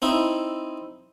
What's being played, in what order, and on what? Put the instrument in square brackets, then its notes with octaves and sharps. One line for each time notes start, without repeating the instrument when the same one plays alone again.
[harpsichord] C4 D#4 E4